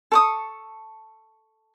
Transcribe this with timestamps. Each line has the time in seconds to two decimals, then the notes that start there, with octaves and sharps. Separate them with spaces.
0.12 A4 C#6 D#6